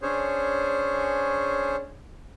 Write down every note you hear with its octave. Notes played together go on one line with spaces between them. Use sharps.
C#4 D4 G#4 C5 C#5